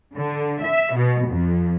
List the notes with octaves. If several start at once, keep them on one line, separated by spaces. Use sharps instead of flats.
D3
E5
B2
F2